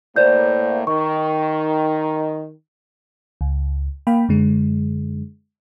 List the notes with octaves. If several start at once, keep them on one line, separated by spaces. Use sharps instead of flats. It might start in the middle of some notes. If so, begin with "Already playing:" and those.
A2 A#3 C5 D5 G6
D#3 C#6
C#2
A#3 F5 G5 B5
F#2 D3 G#3